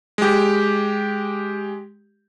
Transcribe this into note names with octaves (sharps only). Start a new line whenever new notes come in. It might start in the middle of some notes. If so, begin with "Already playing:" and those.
G#3 G4